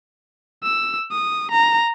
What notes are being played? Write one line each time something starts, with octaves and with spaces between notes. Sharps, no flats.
E6
D#6
A#5